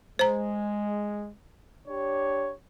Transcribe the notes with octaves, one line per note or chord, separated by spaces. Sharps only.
G#3 C5 A#5
D4 G4 C#5